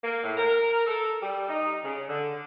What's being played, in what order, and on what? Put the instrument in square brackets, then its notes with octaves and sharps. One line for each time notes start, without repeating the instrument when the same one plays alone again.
[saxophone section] A#3
A2
A#4
A4
G3
D#4
C#3
D3